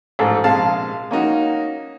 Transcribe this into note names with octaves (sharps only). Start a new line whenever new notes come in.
A1 G#2 A4
A#1 C3 G#3 F5 A5
A#3 C#4 D#4 F#4